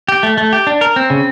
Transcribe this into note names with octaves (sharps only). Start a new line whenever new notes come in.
G4
A3
A3
G4
D4
A#4
C4
C#3